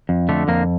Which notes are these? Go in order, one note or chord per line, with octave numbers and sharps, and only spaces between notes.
F2
D3 A3
F2 A#3